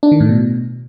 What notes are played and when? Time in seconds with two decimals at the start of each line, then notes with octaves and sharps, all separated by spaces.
0.03 D4
0.12 D#3
0.20 A2
0.29 B2